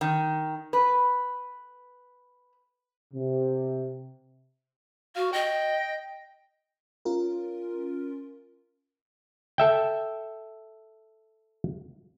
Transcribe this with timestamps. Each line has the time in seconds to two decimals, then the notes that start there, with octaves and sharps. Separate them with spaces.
0.01 D#3
0.73 B4
3.14 C3
5.16 F#4 F5
5.33 D#5 G5
7.05 C#4 F4 A#4
9.58 A4 E5 G5